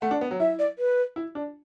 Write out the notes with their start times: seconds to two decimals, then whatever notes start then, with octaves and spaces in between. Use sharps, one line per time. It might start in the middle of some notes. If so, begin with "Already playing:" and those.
0.02 A3 F#5
0.11 D4
0.21 B3
0.31 F#3
0.40 E4 E5
0.59 D5
0.79 B4
1.16 E4
1.35 D4